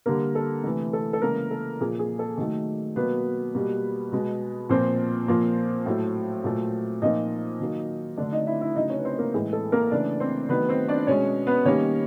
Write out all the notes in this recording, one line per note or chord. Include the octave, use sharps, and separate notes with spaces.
D3 G3 A#3 A#4
A4
C3 E3 A3
A4
A4
C#3 E3 G#3 A#3 A#4
A4
A#2 F3 A#3 G#4
G#4
A4
D#3 F#3 A3
B2 F#3 A#3 B3 B4
B2 G3 A#3
B2 G#3
A#2 F3 A#3 C4 C5
A#2 F3 A#3
A2 F#3 A3
A#2 F#3 A3
A#2 F3 A#3 D#4 D#5
D#3 F#3 A#3
D3 F#3 A3 D4 D5
D#4 D#5
E4 E5
E4 E5
C#3 F#3 A3 D#4 D#5
C#4 C#5
B4
C4 C5
A#3 A#4
A2 E3 G#3 G#4
A4
A#3 A#4
C#3 E3 A3 D4 D5
C4 C5
D#3 F#3 A3 B3 B4
C4 C5
D4 D5
B2 G#3 C#4 C#5
B3 B4
D#3 G3 A#3 C#4 C#5